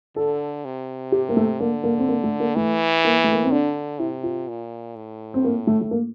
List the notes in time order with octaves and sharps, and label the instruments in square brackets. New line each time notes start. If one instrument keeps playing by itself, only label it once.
[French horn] D3 [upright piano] A4
[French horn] C3
[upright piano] G4
A#3
A3
[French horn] D3 [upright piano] A#3
[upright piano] A#3
C4
A#3
A3
A#3
[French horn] E3 [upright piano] A3
[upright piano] A#3
A3
A#3
C4
[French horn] D3 [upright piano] D4
[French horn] C3 [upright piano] E4
[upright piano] F4
[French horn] A#2
A2
[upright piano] C4
A#3
A3
A3
A#3